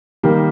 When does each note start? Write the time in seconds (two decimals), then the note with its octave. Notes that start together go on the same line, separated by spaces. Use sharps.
0.23 D#3 G3 A#3